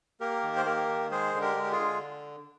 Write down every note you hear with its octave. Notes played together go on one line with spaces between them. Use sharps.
A#3 G4 A#4
D#3
C5
A#3 G4 A#4
D#3
G#3 G#4 C5
D3
G4 A#4
G#3
G4
F4 G#4
D3